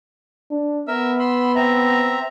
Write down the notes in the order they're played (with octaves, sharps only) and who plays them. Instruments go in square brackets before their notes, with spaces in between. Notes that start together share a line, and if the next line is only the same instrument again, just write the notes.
[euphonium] D4
[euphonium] B3 [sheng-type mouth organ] A#4 E5 E6
[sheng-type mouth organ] B5 C6 E6
C4 E5 A#5